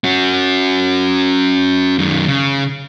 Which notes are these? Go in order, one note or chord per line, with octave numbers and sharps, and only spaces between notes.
C#4 F#4
F#2 D#3
C#3